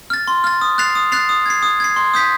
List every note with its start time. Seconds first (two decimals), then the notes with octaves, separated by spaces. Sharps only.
0.10 F6 A6
0.28 C6
0.44 F6 A6
0.61 D#6
0.78 F#6 A6 C7 F7
0.95 D#6
1.12 F#6 A6 C7 F7
1.29 D#6
1.46 G#6 C7
1.63 D#6
1.80 G#6 C7
1.96 C6
2.14 D#6 G6 B6